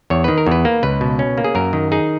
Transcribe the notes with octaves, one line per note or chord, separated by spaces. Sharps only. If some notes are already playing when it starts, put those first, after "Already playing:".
E2 C#5
D#3 B4
A#4
E2 B4
A#3
C#2 B4
B2
C#4
A#3
G#4
F#2 A#4
D#3
D#4 G#4